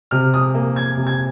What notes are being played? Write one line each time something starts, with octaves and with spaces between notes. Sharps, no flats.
C3 F6
D#6
A#3
G#6
C3
G#6